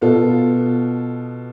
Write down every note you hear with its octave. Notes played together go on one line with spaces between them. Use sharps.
B2 B3 F4 A4